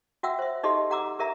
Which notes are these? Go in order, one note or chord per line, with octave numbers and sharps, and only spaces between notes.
F#4 E5 F#5 G5 E6
C5 E5
D#4 G4 A4 D#5 E5 C6
G4 F#5 A#5 D6 E6
G4 A#4 E5 A#5